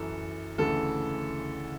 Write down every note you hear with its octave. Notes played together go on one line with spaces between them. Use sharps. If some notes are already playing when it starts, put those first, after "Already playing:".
Already playing: F#2 E3 A4
D2 C#3 E3 A4